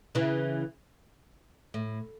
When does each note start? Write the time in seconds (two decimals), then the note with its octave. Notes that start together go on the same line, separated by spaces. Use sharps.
0.15 C#3 E3
1.74 A2